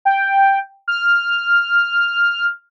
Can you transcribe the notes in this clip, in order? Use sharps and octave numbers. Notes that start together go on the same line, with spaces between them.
G5
F6